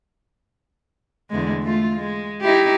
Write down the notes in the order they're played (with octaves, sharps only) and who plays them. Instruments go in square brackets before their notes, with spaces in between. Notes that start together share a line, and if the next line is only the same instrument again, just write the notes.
[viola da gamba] E2 D3 G#3
A3 F4
G#3
D#4 E4 G4